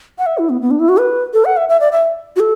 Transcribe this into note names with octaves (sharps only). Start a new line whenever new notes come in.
F#5
E5
E4
B3
B3
D4
E4
F#4
B4
A4
F#5
E5
E5
D5
E5
F#4
A4